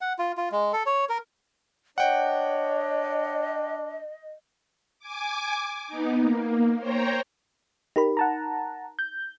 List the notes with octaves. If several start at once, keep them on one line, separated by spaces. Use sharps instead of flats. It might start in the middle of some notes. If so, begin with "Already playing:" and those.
F#5
F4
F4
G#3
A4
C#5
A#4
D4 C#5 D#5 F#5 G5
G#5 D6
B3 D#4
A#3
C5 C#5 G5 A#5
D#4 G4 A#4 B5
F#5 A5 A#5
G6